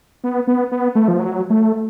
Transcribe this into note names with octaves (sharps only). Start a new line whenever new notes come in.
B3
B3
B3
A3
F3
F#3
A3